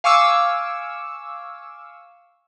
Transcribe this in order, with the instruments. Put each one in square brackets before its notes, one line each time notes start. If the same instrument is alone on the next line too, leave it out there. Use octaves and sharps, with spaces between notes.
[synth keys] F5 G#5 C#6 D6 E6